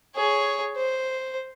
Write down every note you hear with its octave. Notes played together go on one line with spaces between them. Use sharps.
G#4 C#5
C5